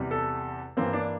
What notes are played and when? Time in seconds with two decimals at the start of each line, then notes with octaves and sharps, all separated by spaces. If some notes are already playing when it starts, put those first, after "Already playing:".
Already playing: E2 C3 G3
0.11 A4
0.77 G2 E3 A#3 C4
0.93 D4